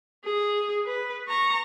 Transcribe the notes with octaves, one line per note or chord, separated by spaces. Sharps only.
G#4
B4
A#5 C#6